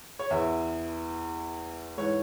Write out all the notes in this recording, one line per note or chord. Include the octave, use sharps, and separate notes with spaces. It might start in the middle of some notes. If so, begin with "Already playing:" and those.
C#5
E2 E3 E5
G#2 E3 C#5